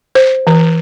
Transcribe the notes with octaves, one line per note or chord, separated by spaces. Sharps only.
C5
E3